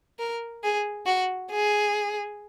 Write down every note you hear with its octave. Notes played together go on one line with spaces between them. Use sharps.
A#4
G#4
F#4
G#4